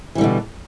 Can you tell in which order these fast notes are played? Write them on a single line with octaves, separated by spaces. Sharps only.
E3 G3 D3 B2